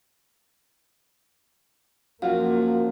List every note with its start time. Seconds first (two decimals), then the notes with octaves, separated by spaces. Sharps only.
2.22 F#2 F3 A#3 F4 F#4 F5